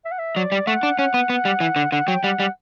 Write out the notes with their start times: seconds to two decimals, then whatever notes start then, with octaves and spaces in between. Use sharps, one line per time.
0.05 E5
0.12 F#5
0.19 E5
0.36 F#3 D5
0.52 G3
0.67 A3 F#5
0.83 D4
0.99 C#4 F#5
1.14 B3
1.29 B3
1.45 G3
1.60 E3
1.76 D3
1.92 D3 F#5
2.07 F#3 G5
2.24 G3 F#5
2.40 G3